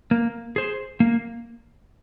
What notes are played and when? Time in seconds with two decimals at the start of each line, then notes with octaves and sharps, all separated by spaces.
0.11 A#3
0.56 G#4 C5
1.00 A#3